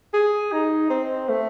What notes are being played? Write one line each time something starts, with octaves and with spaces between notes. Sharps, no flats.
G#4
D#4
C4
A3